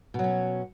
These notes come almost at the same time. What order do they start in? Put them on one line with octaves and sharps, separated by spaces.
B2 F#3 C#4